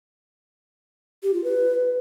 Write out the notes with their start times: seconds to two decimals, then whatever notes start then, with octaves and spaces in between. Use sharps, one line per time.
1.23 G4
1.34 F4
1.44 B4